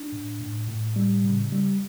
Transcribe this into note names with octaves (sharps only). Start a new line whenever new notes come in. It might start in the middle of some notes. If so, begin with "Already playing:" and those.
Already playing: D4
A2
A2
A2
G3
C#3
G3